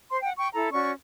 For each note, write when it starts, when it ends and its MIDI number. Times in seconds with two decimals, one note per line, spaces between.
0.10 0.20 72
0.10 0.20 84
0.22 0.31 78
0.22 0.31 79
0.37 0.48 79
0.37 0.48 85
0.53 0.68 64
0.53 0.68 69
0.53 0.68 82
0.72 0.91 61
0.72 0.91 66
0.72 0.91 74
0.72 0.91 85